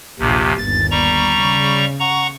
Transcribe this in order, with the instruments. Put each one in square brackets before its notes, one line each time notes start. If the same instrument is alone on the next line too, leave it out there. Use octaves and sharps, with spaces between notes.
[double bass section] A#1 [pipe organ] D#2 C3
[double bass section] G1 D#2 [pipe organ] A6
[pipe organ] G3 A#5 C#6
[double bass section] C#3
[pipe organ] F#5 A#5 C#6